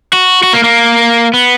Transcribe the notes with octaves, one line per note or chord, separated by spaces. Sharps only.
F#4
F#4
A#3
A#3
B3